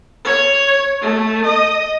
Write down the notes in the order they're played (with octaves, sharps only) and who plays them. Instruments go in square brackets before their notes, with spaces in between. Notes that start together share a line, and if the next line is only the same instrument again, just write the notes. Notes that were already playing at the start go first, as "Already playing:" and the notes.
[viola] C#5
A3
D#5